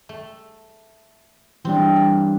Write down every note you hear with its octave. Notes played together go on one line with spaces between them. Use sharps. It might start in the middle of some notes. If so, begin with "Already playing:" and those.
A3
E3 G3 C4 D4
A#3